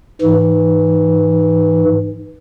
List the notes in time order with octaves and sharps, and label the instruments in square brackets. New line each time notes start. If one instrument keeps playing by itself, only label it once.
[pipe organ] G#2 E3